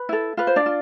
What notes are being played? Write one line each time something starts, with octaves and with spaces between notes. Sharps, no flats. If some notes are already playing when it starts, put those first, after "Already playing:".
Already playing: B4
E4 A4
F4 B4
C5
D4 D5
F4